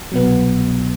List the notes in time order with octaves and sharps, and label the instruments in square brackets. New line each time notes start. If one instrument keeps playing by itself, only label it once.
[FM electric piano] C2 B2 F#3 B3